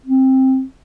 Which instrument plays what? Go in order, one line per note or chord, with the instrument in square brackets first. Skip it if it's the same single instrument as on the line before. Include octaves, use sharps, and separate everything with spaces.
[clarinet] C4